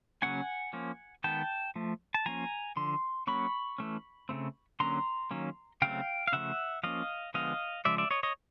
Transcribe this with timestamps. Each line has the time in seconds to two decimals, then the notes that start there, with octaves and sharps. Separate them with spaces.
0.22 C#3 F#3 A#3 C#4 F#5 G#5
0.73 F3 A#3 C#4
1.24 D#3 G#3 B3 G5 A5
1.76 F3 A3
2.14 A5
2.26 F3 A#3 C#4 G#5 A#5
2.76 D3 F3 C6
3.27 F#3 A#3 C#4 B5 C#6
3.78 E3 A3 C#4
4.29 C#3 F3 A3 C4
4.80 D3 F#3 A#3 C#4 A#5 C6
5.31 D#3 F#3 A#3 C#4
5.82 C#3 F#3 A3 C4 F5 G5
6.28 F5
6.32 C#3 F3 A3 E5 F#5
6.83 F3 A#3 C#4 D#5 F5
7.34 D3 F3 G#3 B3 D#5 F5
7.85 C#3 F3 G#3 D5 E5
7.98 D5 E5
8.11 C#5 D#5
8.23 C#5 D#5